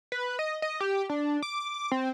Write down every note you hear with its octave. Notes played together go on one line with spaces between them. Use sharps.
B4
D#5
D#5
G4
D4
D6
C4